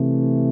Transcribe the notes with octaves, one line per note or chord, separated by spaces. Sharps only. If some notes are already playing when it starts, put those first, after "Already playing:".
Already playing: C3 E3 A3